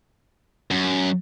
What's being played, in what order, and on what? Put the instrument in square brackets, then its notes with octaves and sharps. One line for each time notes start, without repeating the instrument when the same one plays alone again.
[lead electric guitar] F#2